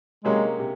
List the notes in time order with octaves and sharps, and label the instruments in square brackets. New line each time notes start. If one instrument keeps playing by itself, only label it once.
[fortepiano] C3 F#3 A#3 C#4 G#4 [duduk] G#3
[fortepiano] C3